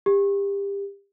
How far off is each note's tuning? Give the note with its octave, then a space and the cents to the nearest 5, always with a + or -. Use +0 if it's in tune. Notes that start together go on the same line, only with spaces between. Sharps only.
G4 +30